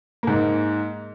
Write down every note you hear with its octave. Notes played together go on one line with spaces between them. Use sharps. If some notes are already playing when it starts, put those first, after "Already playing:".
G#2 A#3